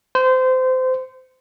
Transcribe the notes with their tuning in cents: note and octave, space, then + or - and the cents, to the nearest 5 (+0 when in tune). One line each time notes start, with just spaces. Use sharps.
C5 -25